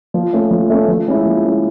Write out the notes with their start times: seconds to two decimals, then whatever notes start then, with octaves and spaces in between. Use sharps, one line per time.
0.14 F3
0.33 A3 C#4
0.51 F3
0.70 A3 C#4
0.89 F3
1.08 G#3 C#4 E4
1.25 F3
1.44 G#3 C#4 E4